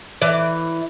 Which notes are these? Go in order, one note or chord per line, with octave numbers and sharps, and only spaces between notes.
E3 D5